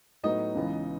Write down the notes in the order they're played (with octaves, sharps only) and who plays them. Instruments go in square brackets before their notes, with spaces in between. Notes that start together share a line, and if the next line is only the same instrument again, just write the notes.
[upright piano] A2 F#3 B3 D#4 D#5
C#2 C#3 E3 B3